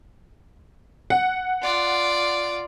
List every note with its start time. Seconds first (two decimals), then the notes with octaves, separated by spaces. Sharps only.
1.10 F#5
1.62 F4 D5